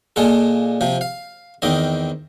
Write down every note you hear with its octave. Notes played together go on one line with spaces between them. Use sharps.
A#2 G#3 F4 A4
C3 F3
F5
E2 D#3 C4 D#5